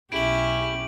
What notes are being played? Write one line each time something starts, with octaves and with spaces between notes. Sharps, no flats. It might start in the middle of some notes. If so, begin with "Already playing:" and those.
B1 C#4 E4 G4 D7 F#7